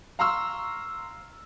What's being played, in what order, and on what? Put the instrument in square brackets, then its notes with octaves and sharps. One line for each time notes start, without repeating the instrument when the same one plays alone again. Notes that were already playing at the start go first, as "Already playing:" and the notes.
[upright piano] F5 A#5 C6 C#6 E6 F6